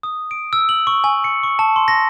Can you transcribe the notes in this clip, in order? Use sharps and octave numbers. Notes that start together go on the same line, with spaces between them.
D#6
D7
E6
F#7
C#6
G#5
C#7
C#6
A5
C6
A#6